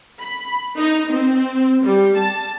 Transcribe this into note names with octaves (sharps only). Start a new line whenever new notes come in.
B5
D#4
C4
G3
A5